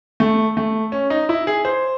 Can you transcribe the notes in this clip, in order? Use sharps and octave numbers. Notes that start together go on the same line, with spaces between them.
A3
A3
C#4
D#4
E4
G#4
C5